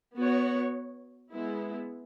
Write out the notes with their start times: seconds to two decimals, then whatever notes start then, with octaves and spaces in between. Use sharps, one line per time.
0.17 B3 F#4 C#5
1.31 G#3 B3 E4